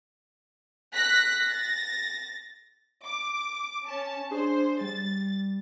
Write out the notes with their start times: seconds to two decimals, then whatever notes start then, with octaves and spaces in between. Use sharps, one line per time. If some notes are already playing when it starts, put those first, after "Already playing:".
0.94 F#6 A#6 B6
1.49 A6 A#6
3.04 D6
3.85 C#4 A5
4.31 D4 G#4 C5
4.81 G3 A6